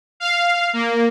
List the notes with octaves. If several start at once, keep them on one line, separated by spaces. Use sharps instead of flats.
F5
A#3